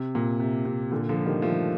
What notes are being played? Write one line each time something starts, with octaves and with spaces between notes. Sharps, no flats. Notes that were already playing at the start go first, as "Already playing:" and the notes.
Already playing: C3
A#2
C3
C3
A#2 D3
D3 F3
D#3 G3
F3 A3